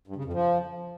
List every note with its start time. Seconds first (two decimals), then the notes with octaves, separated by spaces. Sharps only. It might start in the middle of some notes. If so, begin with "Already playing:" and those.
0.07 G2
0.16 C#3
0.25 F2
0.33 F3